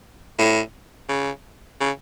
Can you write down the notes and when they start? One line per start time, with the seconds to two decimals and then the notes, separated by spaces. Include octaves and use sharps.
0.39 A2
1.09 C#3
1.80 C#3